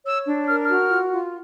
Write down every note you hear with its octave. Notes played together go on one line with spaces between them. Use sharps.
C#5 E6
D4
A#4 F6
F#4 F6
F4
F4